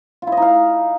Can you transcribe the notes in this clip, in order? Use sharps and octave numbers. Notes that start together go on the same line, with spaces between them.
F4
E4
D#5
D#4
F5